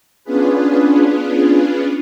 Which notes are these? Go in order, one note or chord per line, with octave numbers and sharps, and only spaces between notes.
B3 C#4 D4 F4 G#4 B4